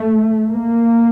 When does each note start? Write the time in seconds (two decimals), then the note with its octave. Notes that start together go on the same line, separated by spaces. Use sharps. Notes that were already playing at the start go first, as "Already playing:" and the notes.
Already playing: A3
0.50 A#3